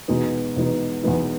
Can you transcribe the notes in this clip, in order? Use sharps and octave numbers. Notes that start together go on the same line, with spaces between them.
E2 B2 G#3 B3 D#4
E2 B2 G#3 B3 D#4
E2 B2 G#3 B3 D#4